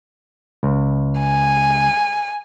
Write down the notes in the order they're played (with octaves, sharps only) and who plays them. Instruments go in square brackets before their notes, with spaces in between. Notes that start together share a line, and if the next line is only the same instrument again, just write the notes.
[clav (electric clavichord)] C#2
[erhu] G#5